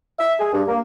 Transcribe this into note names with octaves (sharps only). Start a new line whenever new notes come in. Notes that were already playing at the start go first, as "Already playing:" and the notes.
E5
G#4
G2
A#3